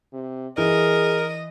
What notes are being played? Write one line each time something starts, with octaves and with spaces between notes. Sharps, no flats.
C3
E3 G#4 A#4 D#5